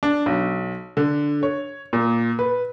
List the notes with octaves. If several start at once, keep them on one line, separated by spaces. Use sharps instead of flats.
D4
B1
D3
C#5
A#2
B4